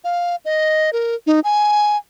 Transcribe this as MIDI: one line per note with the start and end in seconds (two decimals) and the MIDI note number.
0.04 0.36 77
0.45 0.90 75
0.93 1.15 70
1.27 1.40 63
1.44 1.97 80